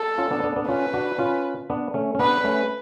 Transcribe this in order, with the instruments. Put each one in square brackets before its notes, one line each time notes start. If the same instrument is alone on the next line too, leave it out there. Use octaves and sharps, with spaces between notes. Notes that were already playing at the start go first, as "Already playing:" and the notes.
Already playing: [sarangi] A4
[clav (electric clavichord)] C#4 F4
B3 D4
B3 D4
B3 D4
[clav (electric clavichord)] C#4 F4 [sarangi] B4
[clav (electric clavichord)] D4 F#4
C#4 F4
B3 D4
A3 C#4
C#4
[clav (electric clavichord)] B3 D4 [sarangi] B4
[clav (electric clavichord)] A3 C#4